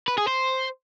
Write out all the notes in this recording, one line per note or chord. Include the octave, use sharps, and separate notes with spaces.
B4
G#4
C5